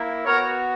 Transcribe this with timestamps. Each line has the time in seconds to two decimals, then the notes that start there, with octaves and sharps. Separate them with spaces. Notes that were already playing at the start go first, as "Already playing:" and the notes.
Already playing: A#3 E4
0.25 B3 F#4 A#4 C#5